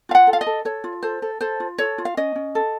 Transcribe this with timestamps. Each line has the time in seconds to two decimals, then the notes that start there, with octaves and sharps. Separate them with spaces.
0.09 F4 F5
0.15 F#5
0.27 A4
0.33 F5
0.41 D#5
0.46 A4
0.65 A4 C#5
0.84 F4
1.03 A4 C5
1.22 A4
1.41 A4 C5
1.60 F4
1.78 A4 C#5
1.98 F4
2.05 F5
2.17 C#4 D#5
2.35 C#4
2.55 A4